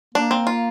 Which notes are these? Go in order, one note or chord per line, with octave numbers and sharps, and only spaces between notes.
A#3 D4
C4
F4